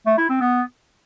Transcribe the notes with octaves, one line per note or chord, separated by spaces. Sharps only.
A3
E4
C4
B3